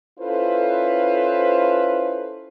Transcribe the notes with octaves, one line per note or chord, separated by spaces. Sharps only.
C#4 E4 F4 A4 B4 C5